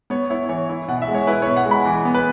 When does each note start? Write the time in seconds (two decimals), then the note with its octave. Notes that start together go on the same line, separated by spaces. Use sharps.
0.10 B3 C#5
0.30 E4 C#5
0.49 E3 C#5
0.69 E4
0.88 B2 F#5
1.02 E5
1.08 G#3
1.15 C#5
1.27 E4 B4
1.42 B2 C#5
1.56 F#5
1.66 G#3
1.71 B5
1.85 E3
2.05 B3
2.14 B4